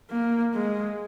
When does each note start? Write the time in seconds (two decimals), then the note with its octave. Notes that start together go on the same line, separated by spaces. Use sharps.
0.10 A#3
0.53 G#3